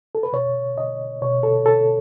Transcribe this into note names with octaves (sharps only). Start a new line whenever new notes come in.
A4
B4
B2 C#5
D#5
B2 C#5
A4
A4